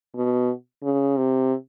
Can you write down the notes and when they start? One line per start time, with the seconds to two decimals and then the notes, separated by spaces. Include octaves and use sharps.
0.15 B2
0.83 C#3
1.18 C3